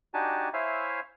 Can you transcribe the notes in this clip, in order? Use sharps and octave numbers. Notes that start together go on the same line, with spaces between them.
D4 D#4 F#4 G4 G#5 A5
E4 C5 C#5 E5 F5 G#5